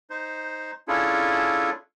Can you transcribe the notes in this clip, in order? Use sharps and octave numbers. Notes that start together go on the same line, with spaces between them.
D#4 C5
C#4 D4 E4 F4 G#4 A4